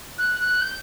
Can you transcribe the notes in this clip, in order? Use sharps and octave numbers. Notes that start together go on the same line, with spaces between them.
F#6
F#6
G6